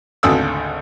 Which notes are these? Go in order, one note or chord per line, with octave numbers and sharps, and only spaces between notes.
G#1 D2 C#3 A4 D#6 E6